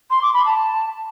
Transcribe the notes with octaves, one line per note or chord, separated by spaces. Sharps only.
C6
D6
B5
A5